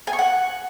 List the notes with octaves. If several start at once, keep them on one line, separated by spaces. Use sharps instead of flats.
G#5
C#6
F#5